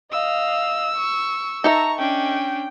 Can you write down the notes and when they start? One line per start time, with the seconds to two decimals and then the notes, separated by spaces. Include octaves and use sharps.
0.12 D#5 F5 E6
0.96 C#6
1.64 D#4 A4 E5 A#5 C#6
1.99 C#4 D4 G5